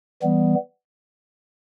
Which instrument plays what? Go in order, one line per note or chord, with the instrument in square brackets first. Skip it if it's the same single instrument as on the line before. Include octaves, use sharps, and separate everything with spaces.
[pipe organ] E3 G3 B3